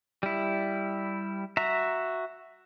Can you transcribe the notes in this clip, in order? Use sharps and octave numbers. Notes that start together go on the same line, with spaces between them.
G3 E4
F#4 E5 A#5